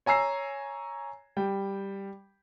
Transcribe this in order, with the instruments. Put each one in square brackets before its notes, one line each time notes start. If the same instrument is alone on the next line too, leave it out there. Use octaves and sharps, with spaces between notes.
[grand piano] C#5 G#5 A#5 E6 C7
G3 G5